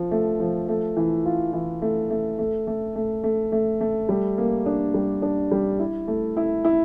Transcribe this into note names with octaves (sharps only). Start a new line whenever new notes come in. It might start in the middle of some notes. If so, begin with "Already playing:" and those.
Already playing: F3
A3
F3
A3
E3
F4
E3
A3
A3
A3
A3
A3
A3
A3
A3
G3
A#3
D4
G3
D4
G3
E4
A3
E4
E4